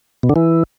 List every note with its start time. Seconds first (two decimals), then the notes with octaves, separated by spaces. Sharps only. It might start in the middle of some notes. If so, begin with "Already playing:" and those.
0.23 B2
0.29 D3
0.36 E3